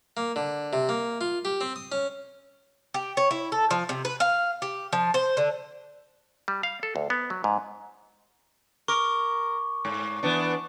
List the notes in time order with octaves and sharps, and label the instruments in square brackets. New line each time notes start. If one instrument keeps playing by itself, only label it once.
[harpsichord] A#3
D3
C3
A#3
F4
G4
C4
D#6
C#4
[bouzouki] G4
C#5
E4
A4
F3
C3
B4
F5
G4
F3
C5
D3
[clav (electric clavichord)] G3
F5
A4
D2
B3
F#3
G#2
[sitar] A#4 [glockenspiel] C#6 D6
[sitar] G#2
E3 B3 D4